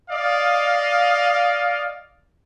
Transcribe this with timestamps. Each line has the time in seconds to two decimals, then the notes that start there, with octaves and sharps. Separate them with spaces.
0.11 D5 D#5 F5